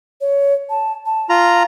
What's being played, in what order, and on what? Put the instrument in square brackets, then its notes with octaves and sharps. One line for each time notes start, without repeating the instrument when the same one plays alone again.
[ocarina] C#5
A5
A5
[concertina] F4 A#5